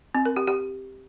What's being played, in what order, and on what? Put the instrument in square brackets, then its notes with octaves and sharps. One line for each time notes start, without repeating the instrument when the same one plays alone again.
[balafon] C4
A#4
G4
G4